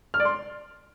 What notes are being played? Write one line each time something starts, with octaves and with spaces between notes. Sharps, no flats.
F6
D5
C6